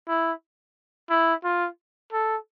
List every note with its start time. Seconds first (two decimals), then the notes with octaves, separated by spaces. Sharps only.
0.08 E4
1.10 E4
1.44 F4
2.13 A4